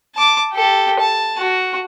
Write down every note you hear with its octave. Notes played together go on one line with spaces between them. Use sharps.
A5 D6
G4 A4
A5
F#4